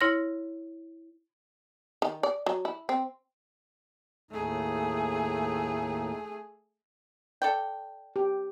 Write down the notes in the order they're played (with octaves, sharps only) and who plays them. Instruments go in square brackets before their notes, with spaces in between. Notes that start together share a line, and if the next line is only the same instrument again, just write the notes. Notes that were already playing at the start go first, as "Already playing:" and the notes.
[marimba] E4 C#5 C6 F6 A#6
[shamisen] D#3
D5
F#3
E4
C4
[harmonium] D#2 A2 D#4 [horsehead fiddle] A3 G#4
[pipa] A4 D5 G5
[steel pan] G4